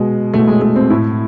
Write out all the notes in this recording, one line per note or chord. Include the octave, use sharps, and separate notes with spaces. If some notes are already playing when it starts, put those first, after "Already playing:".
Already playing: B2 G#3
B2 A3
G#3
A3
C4
A2 E4